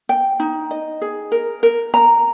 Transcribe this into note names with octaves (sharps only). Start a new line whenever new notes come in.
G5
D#4
D#5
G#4
A#4
A#4
A#5